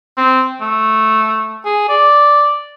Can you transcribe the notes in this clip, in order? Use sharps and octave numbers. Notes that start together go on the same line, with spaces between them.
C4
A3
G#4
D5